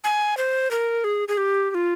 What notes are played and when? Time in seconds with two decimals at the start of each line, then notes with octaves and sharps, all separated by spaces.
0.04 G#5
0.37 C5
0.71 A#4
1.04 G#4
1.28 G#4
1.38 G4
1.70 G4
1.75 F4